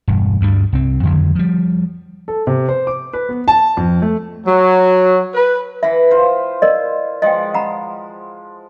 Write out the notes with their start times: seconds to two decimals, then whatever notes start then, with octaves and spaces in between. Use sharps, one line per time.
0.08 E1 G2
0.41 D2 G2 G3
0.73 C2 C4
1.03 F2 D3 D#3 F#3
1.35 F3 G3
2.28 A4
2.47 C3
2.69 C5
2.87 D6
3.13 B4
3.29 B3
3.48 A5
3.77 F2
4.02 A3
4.47 F#3
5.34 B4
5.83 E3 E5 B5
6.11 F4 C5
6.62 A#4 D5 D#5
7.22 F3 G#3 D#5 G5
7.54 F#5 A#5 B5